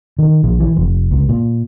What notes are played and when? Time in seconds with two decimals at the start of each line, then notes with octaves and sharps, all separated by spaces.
0.19 D#3
0.44 A#1
0.60 E3
0.76 F1
1.11 C#2
1.29 A#2